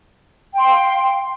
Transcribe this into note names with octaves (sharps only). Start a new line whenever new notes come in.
F5 G5 C6